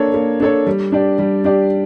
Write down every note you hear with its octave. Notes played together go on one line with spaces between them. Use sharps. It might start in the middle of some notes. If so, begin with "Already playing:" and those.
Already playing: A#3 D4 A4 C#5
A#3
D4 A4 C#5
G3
D4 G4 D5
G3
D4 G4 D5